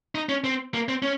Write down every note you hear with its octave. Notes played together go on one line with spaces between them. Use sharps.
D#4
C#4
C4
A#3
C4
C#4